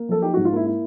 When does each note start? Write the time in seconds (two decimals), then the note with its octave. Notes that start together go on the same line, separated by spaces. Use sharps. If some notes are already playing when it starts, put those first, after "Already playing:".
Already playing: A#3
0.09 F3 A4
0.22 D#4 G4
0.34 F#4
0.37 G#2
0.45 F4
0.52 A#3 E4
0.66 E4